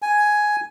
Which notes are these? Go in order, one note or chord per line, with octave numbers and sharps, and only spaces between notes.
G#5